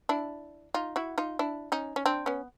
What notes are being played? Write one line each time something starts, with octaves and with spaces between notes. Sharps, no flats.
D4 E4
D#4 F4
E4 F#4
D#4 F4
D4 E4
C#4 D#4
C#4
C4 D4
B3 C#4